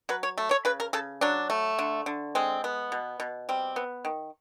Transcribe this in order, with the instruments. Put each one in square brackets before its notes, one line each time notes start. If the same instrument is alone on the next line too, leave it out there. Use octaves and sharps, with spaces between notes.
[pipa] F#3 B4
C#5
A3
C#5
C#3 B4
A#4
C#3 A4
F#3 D4
A3
D3
D3
G#3 C4
B3
B2
B2
G3 C4
B3
D#3